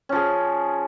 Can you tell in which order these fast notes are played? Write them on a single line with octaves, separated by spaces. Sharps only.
C#4 F3 G#4